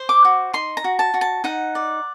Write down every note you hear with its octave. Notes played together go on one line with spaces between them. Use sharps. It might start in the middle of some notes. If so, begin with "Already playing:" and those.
Already playing: C5
D6
F#4
D#4 C6
A#5
F#4
A5
F#4
A5
D#4 F#5
D5